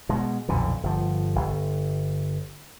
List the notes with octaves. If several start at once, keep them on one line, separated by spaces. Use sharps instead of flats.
B2 G#3
B1 F2 A#2 D3
G1 F3
G1